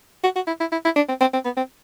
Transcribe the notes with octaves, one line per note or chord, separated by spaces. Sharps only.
F#4
F#4
E4
E4
E4
E4
D4
C4
C4
C4
B3
C4